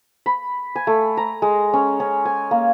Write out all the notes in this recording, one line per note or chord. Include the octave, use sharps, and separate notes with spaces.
B5
G#5
A3
A#5
G#3
C#4
C#4
G#5
A#3